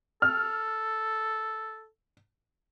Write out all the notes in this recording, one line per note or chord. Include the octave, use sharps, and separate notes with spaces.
A4 F6